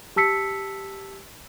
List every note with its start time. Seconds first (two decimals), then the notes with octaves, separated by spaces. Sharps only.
0.16 G4 A5 E6 B6 C#7